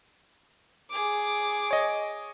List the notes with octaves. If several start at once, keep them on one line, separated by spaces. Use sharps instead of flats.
G#4 D6
C#5 D#5